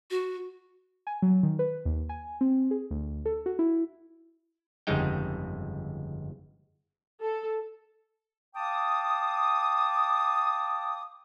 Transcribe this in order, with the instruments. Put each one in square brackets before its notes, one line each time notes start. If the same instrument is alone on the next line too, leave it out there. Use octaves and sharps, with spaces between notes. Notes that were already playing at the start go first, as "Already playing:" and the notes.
[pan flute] F#4
[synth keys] G#5
F#3
D#3
B4
D#2
G#5
C4
G#4
D2
A4
F#4
E4
[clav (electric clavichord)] G1 F2 C#3 G#3 D#4 G5
[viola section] A4
[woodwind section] F5 G5 A5 D6 D#6